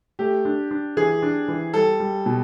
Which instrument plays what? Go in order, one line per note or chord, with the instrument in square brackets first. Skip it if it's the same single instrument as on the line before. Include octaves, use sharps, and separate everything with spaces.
[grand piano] A3 [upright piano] G4
[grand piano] D4
D4
[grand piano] E3 [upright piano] G#4
[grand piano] D4
E3
[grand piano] G3 [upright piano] A4
[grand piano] G3
B2